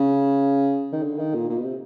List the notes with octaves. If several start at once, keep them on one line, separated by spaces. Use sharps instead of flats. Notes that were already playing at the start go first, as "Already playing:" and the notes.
Already playing: C#3
D#3
D3
D#3
A#2
A#2
B2
C3